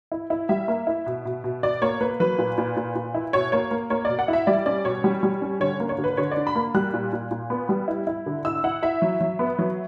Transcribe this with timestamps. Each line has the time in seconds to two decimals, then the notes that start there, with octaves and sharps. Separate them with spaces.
0.12 E4
0.30 E4
0.49 G3 E5
0.68 A#3
0.87 E4
1.06 B2
1.25 B2
1.44 B2
1.63 B2 D5
1.82 A#3 C#5
2.01 A#3 B4
2.20 F#3 B4
2.39 A#2
2.58 A#2
2.76 A#2
2.95 A#2
3.14 E4
3.33 B2 C#5
3.52 A#3 C#5
3.71 A#3
3.90 A#3 C#5
4.05 B2 D5
4.19 F#5
4.28 E4 E5
4.47 G3 D5
4.66 C#4 D5
4.85 B2 C#5
5.04 G3
5.23 G3
5.42 C#4
5.60 D3 C#5
5.80 A#3
5.89 C#5
5.98 D3
6.04 B4
6.17 D3 C#5
6.31 D5
6.37 D4
6.47 B5
6.55 A#3
6.74 G3 F#6
6.94 A#2
7.13 A#2
7.31 A#2
7.50 B3
7.69 G3
7.88 E4
8.07 E4
8.26 D3
8.45 E4 E6
8.64 E4 F#5
8.83 E4 E5
9.02 F#3
9.21 F#3
9.39 B3
9.59 F#3